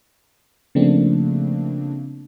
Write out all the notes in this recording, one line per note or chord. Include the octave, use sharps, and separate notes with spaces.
C#3 F3 A3 A#3 C4 D4